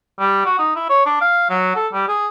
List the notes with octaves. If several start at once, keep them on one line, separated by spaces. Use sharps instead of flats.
G3
F#4
D#4
E4
C#5
D4
F5
F#3
A4
G3
G#4